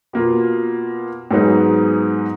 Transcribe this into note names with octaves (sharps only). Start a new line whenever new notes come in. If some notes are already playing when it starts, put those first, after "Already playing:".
B2 A#3 F4
G#2 F#3 B3 D#4 G#4